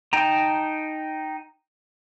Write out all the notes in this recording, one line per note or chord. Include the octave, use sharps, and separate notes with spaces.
D#4 G5 A5 A#5